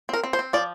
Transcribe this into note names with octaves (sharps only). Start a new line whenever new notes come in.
C4 A#4
C4
C5
C4
F3 D5